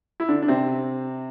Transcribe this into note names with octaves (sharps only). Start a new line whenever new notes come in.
E4
D3 D4
D4
C3 C4